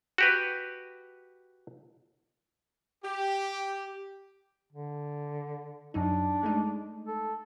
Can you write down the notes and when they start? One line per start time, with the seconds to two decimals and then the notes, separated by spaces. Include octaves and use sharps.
0.18 F#4 G4 B4
3.04 G4
4.72 D3
5.94 F#2 F#3 D4 D#4
6.43 G#3 A3 D#4
7.07 A4